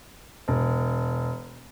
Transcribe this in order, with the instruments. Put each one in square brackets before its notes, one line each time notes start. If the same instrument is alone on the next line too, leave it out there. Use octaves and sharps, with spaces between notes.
[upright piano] E1